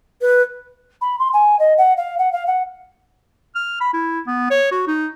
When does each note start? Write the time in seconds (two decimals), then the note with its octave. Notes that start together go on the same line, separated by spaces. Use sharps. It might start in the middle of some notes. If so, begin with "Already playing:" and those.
0.21 B4
1.01 B5
1.19 C6
1.33 G#5
1.59 D#5
1.78 F#5
1.97 F5
2.19 F#5
2.32 F5
2.47 F#5
3.55 F6
3.81 B5
3.94 E4
4.27 B3
4.51 C#5
4.71 F#4
4.87 D#4